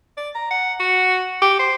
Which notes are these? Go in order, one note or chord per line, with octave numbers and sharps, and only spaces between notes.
D5
A#5
F#5
F#4
G4
C5